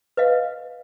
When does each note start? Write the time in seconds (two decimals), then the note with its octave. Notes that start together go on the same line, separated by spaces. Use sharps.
0.17 B4 D#5 F5